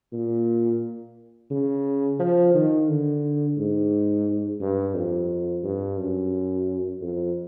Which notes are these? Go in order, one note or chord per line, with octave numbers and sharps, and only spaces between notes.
A#2
C#3
F3
D#3
D3
G#2
G2
F2
G2
F#2
F2